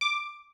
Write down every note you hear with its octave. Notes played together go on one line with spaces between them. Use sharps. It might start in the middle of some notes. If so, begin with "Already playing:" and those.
D6